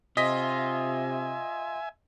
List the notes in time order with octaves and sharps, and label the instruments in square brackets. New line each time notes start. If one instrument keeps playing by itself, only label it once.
[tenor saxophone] C3 [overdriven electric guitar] F4 [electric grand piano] D#5 B6 [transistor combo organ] E5 G#5